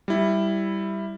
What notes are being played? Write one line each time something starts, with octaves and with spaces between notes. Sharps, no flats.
G3 E4